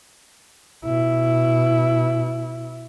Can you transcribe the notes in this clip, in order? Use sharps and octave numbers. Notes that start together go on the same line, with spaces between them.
B2 E4